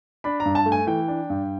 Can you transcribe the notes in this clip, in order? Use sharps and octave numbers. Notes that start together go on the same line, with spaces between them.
D4 B5
A#5
G2
A5
A3
G#5
E3 G5
D4
G2